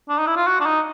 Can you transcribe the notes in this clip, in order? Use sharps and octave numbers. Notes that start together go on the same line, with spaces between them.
D4
D#4
E4
F4
F#4
D4
D#4